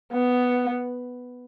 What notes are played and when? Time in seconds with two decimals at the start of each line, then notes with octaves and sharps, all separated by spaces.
0.12 B3